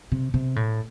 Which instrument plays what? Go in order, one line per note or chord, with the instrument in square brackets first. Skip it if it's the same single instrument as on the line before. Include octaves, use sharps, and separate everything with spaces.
[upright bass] C3
C3
A2